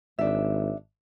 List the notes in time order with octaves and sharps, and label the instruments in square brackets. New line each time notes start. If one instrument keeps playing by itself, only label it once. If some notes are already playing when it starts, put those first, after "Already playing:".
[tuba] G#1 [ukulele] D4 E5